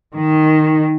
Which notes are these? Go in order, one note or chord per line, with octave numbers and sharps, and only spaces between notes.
D#3